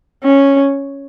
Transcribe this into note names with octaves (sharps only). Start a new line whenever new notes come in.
C#4